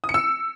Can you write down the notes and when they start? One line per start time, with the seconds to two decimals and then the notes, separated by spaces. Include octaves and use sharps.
0.04 D#6
0.09 C#7
0.14 E6